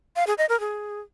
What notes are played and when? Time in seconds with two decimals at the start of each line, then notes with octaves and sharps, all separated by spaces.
0.16 F5
0.27 G#4
0.38 D#5
0.49 A#4
0.60 G#4